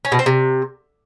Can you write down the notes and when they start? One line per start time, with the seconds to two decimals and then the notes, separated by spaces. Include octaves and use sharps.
0.05 C#4
0.12 B2
0.19 C4
0.26 C3